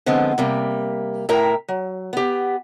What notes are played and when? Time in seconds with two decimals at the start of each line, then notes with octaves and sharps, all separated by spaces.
0.06 D3 F3 G#3 B3 C4
0.38 C3 G3 A#3
1.29 A2 E4 A#4 E5 G5 A#5
1.68 F#3
2.13 B3 G4